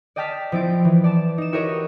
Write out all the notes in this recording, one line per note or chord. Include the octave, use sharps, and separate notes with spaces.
D5 D#5 G5 A5 F6 B6
F3 C4 E4 A6 D7
E3
D5 A5 E7
D#4 E7
E4 F#4 G4 A#4 C#5 D#5